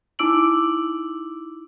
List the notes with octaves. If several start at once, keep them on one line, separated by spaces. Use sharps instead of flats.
D#4 E4 D6 E6 D7 F#7